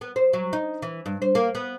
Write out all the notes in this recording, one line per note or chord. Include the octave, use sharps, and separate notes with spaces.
B3
C5
F#3
D#4
E3
G2
C5
A#3
B3